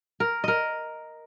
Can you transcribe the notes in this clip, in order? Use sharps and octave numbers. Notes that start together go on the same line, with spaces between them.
A#4
A#4 D#5